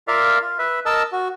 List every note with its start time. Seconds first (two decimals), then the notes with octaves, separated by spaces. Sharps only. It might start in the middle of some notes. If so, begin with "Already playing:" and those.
0.08 F4 A#4 D5 E5 F5
0.41 F4
0.59 B4 E5
0.86 A#4 D#5 A5 E6
1.12 F#4